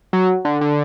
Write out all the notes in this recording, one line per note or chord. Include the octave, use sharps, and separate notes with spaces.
F#3
D3
D3